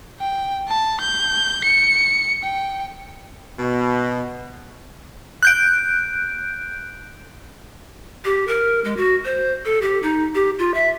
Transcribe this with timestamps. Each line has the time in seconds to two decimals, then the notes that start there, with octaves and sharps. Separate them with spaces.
0.19 G5
0.68 A5
1.00 G6
1.64 C#7
2.43 G5
3.59 B2
5.43 F#6 G6 D7
8.25 G4
8.47 A#4
8.84 G#3
8.97 F#4
9.25 C5
9.65 A4
9.82 G4
10.03 D#4
10.35 G4
10.59 F4
10.74 E5